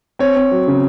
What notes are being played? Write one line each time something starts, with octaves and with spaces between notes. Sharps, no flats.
C4 C#5
C4
F#3
C#3